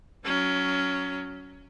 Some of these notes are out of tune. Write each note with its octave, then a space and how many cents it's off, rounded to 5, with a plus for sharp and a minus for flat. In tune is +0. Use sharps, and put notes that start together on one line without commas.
F#3 +0 C#4 +15